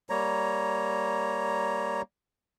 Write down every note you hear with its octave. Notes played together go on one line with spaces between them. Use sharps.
G3 A#3 C#5 A#5